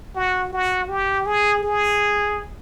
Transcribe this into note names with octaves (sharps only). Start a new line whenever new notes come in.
F#4
F#4
G4
G#4
G#4